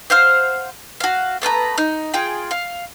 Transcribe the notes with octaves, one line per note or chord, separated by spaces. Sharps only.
C5 F5 F#5 F6
F#4 F5
A3 B3 B4 A#5
D#4
F4 G#4 G5
F5